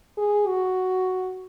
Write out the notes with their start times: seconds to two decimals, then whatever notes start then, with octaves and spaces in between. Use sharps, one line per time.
0.18 G#4
0.47 F#4